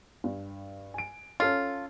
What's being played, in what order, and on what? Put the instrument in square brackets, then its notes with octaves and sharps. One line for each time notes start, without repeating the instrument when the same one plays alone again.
[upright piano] G2
G#5 D7
[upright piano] C#4 A4 C#5 [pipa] F4